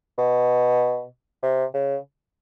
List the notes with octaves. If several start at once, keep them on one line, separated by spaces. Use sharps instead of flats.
B2
C3
C#3